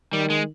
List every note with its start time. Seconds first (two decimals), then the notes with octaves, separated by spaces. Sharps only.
0.12 D#3 G3
0.30 G#3